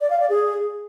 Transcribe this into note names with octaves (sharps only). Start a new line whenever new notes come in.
D5
F5
D5
G#4